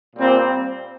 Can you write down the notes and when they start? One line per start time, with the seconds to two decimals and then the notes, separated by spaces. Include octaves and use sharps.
0.16 A#2 G3 C4